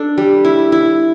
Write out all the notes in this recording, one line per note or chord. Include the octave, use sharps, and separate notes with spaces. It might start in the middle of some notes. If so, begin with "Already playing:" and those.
Already playing: D4 A4
G3
E4
E4